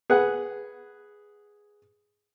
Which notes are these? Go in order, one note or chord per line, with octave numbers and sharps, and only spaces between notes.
G#4 B4 F#5